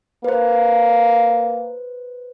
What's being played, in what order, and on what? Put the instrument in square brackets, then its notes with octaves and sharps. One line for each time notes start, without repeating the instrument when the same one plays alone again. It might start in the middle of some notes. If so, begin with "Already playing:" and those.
[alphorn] A#3 [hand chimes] B4 C5